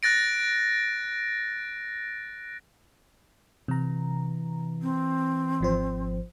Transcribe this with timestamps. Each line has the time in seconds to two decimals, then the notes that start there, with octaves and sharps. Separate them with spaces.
0.03 F#6 A6 A#6 D7
3.68 C3 E3 A#5
4.82 C4
5.61 G#1 F3 C5